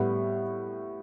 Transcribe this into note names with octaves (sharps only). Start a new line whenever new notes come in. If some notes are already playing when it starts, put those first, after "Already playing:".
Already playing: A2 G3 B3